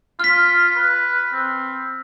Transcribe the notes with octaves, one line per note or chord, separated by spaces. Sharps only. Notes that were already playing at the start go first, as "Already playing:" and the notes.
F4 F6 B6
B4
C4